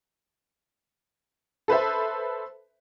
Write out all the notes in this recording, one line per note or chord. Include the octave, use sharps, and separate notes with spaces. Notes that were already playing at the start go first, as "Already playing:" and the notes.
A4 B4 C5 E5